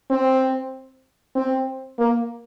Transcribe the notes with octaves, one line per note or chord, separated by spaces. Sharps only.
C4
C4
A#3